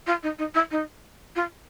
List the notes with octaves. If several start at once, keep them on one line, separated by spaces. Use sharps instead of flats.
F4
D#4
D#4
E4
D#4
F4